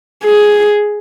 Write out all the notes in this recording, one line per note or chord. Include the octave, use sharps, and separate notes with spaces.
G#4